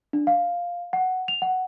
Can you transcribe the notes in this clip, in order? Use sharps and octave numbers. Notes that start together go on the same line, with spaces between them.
D4
F5
F#5
F7
F#5